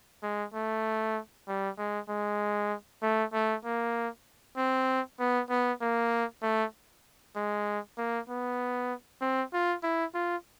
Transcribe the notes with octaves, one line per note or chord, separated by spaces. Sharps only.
G#3
A3
G3
G#3
G#3
A3
A3
A#3
C4
B3
B3
A#3
A3
G#3
A#3
B3
C4
F4
E4
F4